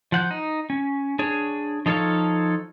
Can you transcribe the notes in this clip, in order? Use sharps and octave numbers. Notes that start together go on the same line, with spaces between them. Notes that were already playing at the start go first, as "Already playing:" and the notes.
F3 F#5 G6
D#4
C#4
D4 G#4 C#5
F3 D#4 A4 C#5 F5